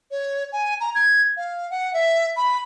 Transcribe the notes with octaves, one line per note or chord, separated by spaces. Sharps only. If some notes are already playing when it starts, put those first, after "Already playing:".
C#5
G#5
A#5
G#6
F5
F#5
E5
B5